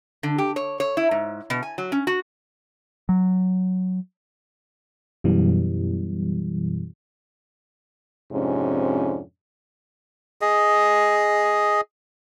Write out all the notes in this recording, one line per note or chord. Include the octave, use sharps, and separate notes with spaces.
D3
G4
C#5
C#5
E4
G#2
B2
G#5
F#3
C#4
F#4
F#3
F#2 B2 E3 G3
F2 G#2 C3 C#4 D4
G#4 D#5